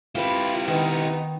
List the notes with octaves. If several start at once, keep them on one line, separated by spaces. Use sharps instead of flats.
E4 F4 G4 B4
D#3 B3 D#4